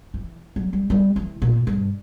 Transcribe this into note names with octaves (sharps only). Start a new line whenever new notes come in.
E3
F#3
G3
G3
E3
A#2
G2